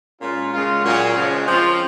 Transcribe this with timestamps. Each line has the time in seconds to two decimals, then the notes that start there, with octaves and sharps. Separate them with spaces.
0.20 A#2 G#3 C#4 F4
0.52 C#3 G#3 C#4 F4
0.83 A#2 F#3 C#4
1.15 C#3 F3 G#3
1.47 F3 C4 F4